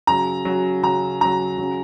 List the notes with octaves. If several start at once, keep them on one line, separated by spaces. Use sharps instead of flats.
C#3 F#3 A#5
C#3 F#3
C#3 F#3 A#5
C#3 F#3 A#5
C#3 F#3